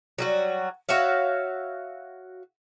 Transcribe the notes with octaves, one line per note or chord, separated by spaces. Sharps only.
F#3 G3 F#4
F#4 C#5 E5 F5